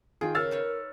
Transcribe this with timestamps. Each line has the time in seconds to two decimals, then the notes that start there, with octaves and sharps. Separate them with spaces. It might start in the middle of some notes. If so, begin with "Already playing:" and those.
0.21 D#3 F4 G#4 G5
0.35 C#3 A#4 E6 F6 A6
0.51 D#4 B4 C#5